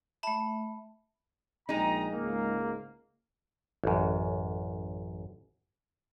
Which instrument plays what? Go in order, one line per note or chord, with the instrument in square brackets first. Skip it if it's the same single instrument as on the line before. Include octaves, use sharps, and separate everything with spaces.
[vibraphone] A3 E5 [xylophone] A5 B5
[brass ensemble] A#1 G5 A#5 [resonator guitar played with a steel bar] G#3 D#4
[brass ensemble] C#2 G#2 A#3
[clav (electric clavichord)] A1 F#2